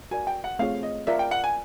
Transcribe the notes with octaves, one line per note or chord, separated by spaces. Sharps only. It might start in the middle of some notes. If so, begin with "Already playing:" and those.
F#4 A#4 D5 G#5
G5
F#5
A3 C4 F4 G#4 C#5 F5
D#5
F4 A#4 D5 E5
G5
F#5
G#5